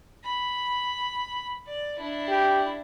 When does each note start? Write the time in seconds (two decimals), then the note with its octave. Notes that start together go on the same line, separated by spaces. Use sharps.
0.24 B5
1.67 D5
1.98 D4 E4
2.28 G4